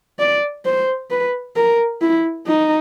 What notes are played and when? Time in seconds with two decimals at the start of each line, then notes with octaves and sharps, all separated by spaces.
0.19 D5
0.65 C5
1.11 B4
1.56 A#4
2.01 E4
2.47 D#4